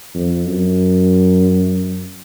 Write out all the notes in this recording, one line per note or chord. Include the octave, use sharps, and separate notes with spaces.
F2
F#2